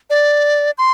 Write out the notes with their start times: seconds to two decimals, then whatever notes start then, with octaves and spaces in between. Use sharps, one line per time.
0.10 D5
0.78 C6